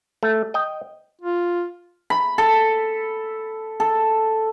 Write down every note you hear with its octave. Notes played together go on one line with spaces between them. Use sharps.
A3
D#5 G5
F4
B5
A4
A4